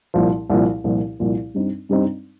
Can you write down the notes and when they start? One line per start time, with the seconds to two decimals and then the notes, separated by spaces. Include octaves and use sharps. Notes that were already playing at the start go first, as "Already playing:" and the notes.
0.14 C2 A#2 F3
0.50 C2 A#2 F3
0.84 C2 A#2 F3
1.19 C2 A#2 F3
1.54 G2 G3 C4 D#4
1.89 G2 G3 C4 D#4